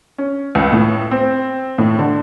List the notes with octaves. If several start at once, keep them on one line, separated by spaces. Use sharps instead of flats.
C#4
C#2
A2
C4
A2
D3